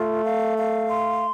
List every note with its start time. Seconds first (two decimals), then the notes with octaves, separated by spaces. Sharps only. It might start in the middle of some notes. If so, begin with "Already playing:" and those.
Already playing: A3 F4
0.23 F5
0.56 F5
0.88 C6